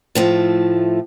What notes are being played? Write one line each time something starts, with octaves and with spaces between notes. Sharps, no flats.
A2 F3 A3